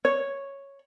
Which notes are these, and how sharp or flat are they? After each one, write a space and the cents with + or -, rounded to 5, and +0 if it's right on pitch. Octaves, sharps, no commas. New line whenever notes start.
C#5 -5